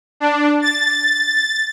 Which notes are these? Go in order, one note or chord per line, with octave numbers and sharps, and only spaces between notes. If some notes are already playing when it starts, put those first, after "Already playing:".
D4
A6